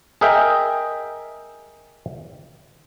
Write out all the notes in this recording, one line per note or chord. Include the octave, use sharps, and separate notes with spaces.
G#4 A#4 D#5 E5 G5